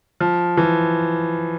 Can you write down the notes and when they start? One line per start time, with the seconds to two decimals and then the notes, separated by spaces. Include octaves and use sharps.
0.20 F3
0.57 E3